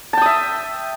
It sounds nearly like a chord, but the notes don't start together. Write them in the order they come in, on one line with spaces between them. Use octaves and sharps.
A5 G5 D#6 E5